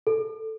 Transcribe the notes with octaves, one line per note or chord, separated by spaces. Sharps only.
A4